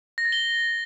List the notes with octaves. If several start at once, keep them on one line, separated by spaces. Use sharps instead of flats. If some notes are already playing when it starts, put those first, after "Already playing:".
A#6
A6
G7